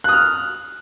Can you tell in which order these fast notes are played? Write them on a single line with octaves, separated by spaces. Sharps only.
F#6 D#6 F6